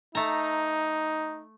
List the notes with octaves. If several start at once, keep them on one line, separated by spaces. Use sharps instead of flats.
A3 D#4 A#5